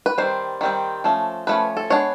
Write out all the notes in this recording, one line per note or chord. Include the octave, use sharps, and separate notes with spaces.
B4
D#3 G3 C4 C5
D#3 G3 C4
F3 A3 C#4
F3 A3 C#4 B4
A4
G#3 B3 D4 C#5